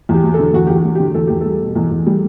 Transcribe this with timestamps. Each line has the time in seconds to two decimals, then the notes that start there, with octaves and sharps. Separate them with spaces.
0.09 E2
0.14 G4
0.23 F#3
0.34 A4
0.39 D3
0.53 E2 F#4
0.67 G4
0.70 E2 F#4
0.85 F#3
0.95 D3 G4
1.14 E2 A4
1.27 E2 G4
1.41 G3 A4
1.61 B2
1.75 E2
1.91 E2
2.07 G3